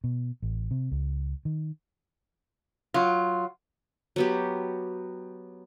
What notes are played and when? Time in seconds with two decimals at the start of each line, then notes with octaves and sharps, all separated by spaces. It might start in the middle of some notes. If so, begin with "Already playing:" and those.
0.04 B2
0.42 A1
0.71 C3
0.91 C#2
1.45 D#3
2.94 F#3 F4
4.16 F#3 B3 G4